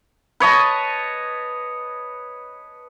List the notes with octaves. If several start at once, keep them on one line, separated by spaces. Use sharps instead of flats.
B4 C#5 D#5 A5